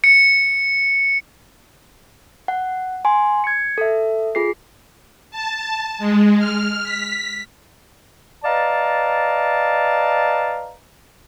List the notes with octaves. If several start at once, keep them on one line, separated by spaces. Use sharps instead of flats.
C#7
F#5
G#5 C6
G#6 C#7
A4 E5
F4 G#4 C7
A5
G#3
F6
B6
B4 D5 D#5 F5 A5 A#5